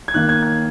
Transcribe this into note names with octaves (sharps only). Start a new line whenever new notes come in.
G#6
D#3 A#3 F#6
G#6
G#6